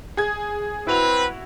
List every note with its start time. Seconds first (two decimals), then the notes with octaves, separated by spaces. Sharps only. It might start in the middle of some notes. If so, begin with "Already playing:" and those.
0.17 G#4 G#6
0.87 C4 E4 F#4 B4 F7